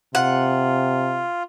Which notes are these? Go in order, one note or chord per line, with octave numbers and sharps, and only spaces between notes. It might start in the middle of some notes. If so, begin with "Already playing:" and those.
C3 F4 F#5